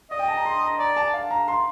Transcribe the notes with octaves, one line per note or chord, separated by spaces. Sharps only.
D5 D#5
G5
A5
A#5
C6
A#5
D5 A#5
A5
F5
A#5
C6